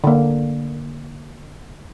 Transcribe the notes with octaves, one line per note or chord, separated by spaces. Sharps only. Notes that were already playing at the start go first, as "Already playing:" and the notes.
D3 A#3